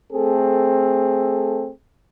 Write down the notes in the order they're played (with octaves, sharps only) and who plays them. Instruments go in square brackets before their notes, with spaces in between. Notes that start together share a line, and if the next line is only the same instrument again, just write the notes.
[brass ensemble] A3 C4 G#4 A4